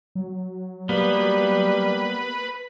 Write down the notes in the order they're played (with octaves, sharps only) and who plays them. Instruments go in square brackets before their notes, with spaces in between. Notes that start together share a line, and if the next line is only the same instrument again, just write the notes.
[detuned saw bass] F#3
[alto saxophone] G3 [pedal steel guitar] A#3 B3 [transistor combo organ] B4